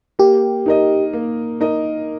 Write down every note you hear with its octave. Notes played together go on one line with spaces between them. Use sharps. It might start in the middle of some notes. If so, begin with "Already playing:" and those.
A#3 G4
D#4 A#4 D#5
A#3
D#4 A#4 D#5